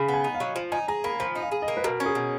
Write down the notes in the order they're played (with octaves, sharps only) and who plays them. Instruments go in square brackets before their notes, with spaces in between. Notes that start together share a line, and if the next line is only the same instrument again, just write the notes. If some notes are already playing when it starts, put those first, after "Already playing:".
Already playing: [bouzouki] C#3 [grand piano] B5
[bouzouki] B3 [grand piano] G#5
[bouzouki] D#4
[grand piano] F5
[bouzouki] F#3
F3
[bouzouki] D#4 [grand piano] G#5
[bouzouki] G#4 [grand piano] A#5
[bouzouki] A#3 [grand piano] B5
[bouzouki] F3 [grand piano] B5
[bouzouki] D#4
[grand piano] F5
[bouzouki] G#4
[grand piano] D#5
[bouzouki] A#3
[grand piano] B4
[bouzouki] B2 [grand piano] A#4
[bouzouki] C#4
[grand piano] G#4
[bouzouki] B2